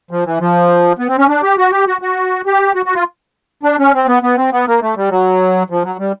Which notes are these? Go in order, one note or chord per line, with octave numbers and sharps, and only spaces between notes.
F3
E3
F3
B3
C4
C#4
D4
G4
F#4
G4
F#4
F#4
G4
F#4
F#4
F4
D4
C#4
C4
B3
B3
C4
B3
A#3
A3
G3
F#3
F3
F#3
G3